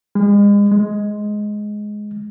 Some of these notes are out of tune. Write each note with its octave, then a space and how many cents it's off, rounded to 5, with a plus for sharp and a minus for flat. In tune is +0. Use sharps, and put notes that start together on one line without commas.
G#3 -35
G#3 +10